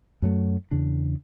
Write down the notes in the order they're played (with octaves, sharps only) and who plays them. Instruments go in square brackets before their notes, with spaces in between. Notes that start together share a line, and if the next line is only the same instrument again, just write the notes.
[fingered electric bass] F#2 F#3 A3
E2 C#3 D4